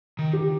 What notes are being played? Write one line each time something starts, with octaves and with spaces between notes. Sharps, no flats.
D#3
G4